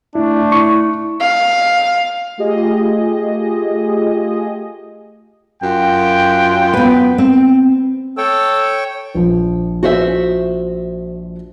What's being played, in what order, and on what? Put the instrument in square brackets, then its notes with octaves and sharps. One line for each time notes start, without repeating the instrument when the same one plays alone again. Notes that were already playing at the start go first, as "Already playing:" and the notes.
[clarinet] A3 [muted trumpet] D4 [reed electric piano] E4
[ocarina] E4 [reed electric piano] C#6
[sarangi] F5
[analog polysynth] A3 F4 G4 G#4 D#5
[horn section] F#2 F4 G5
[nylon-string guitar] B3 B4
C4
[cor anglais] A4 [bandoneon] C#5 G5
[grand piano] A#1 F3
[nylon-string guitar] F#4 C5 E5